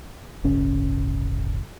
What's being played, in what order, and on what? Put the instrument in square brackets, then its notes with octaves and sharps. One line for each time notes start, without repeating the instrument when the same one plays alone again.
[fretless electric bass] D1 G1 C#3 C#4